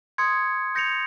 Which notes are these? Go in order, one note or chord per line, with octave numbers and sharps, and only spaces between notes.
C6 D#6 G#6 C#7
G6 A#6 C#7 F7